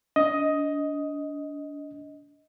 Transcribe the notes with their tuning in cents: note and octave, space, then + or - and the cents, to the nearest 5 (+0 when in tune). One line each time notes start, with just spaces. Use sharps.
D4 -30 D#5 +10